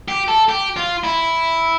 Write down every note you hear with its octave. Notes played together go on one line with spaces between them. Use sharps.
G4
A4
G4
F4
E4